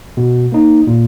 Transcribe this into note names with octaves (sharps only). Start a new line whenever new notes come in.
B2
A#3 D#4
A#2